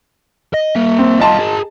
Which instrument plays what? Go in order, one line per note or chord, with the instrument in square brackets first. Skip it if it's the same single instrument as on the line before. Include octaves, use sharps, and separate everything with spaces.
[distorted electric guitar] D#5
A#3 E5
[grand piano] C4
[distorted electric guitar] G3 F4 [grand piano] D#5 A5 C6
[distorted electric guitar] G#4 A#4